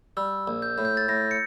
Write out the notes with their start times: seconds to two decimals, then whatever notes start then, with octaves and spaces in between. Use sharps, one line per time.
0.17 G3 E6
0.47 A#1
0.62 G6
0.78 A2
0.85 G6
0.97 A6
1.08 A2 A#6
1.31 C#7